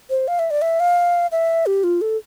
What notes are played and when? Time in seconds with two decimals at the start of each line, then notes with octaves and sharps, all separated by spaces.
0.10 C5
0.28 F5
0.39 E5
0.51 D5
0.62 E5
0.80 F5
1.32 E5
1.66 G4
1.84 F4
2.01 A4